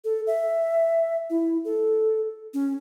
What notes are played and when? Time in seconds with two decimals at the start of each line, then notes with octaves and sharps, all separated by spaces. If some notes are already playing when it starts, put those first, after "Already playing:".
0.05 A4
0.27 E5
1.30 E4
1.65 A4
2.54 C#4